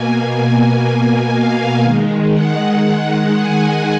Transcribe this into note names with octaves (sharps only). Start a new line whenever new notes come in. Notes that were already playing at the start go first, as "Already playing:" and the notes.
Already playing: B2 A#3 G#5
F5
D#3 G#3
F#5
G#5